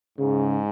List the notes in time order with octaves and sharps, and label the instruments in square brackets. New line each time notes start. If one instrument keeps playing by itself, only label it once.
[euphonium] G#2 [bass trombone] C#3